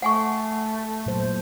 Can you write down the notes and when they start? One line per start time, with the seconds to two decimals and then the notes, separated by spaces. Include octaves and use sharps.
0.02 A3 F#5 G#5 C#6
1.06 A#2 F#3 C5